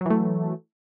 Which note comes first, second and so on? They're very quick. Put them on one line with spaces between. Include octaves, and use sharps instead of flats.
F#3 E3 A3